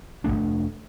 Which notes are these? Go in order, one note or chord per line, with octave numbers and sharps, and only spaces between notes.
F1 F#2 A3 D4